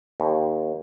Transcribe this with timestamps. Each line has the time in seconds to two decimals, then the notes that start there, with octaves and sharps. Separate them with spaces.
0.20 D#2